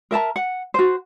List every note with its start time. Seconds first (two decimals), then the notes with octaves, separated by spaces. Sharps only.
0.11 A#4 E5 A5 A#5
0.36 F#5
0.74 F#4 C5